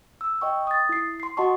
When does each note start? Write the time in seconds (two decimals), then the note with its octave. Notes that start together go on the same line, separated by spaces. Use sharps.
0.21 E6
0.41 D#5 G5 C#6
0.67 D#6 A6
0.89 E4 C7
1.20 C6 C7
1.37 F#4 D#5 F#5 A5 C6 C#6